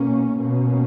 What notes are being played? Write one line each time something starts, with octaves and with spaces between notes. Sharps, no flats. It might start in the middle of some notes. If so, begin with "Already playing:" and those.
Already playing: B2 A#3 C#4
B2 A#3 C#4